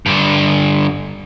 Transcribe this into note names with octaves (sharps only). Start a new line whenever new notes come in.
G2 D3